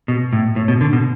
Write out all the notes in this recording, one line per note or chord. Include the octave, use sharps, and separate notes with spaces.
B2
A2
A2
B2
D3
B2